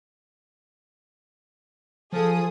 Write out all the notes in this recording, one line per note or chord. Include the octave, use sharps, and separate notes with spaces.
F3 G#4 A4 D#6